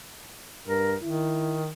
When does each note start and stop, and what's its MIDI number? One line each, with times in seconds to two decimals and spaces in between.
0.67 0.95 43
0.67 0.95 70
1.03 1.72 51
1.03 1.62 64